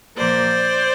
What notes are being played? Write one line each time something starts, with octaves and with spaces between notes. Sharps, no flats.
A#2 F3 A#3 C5 D5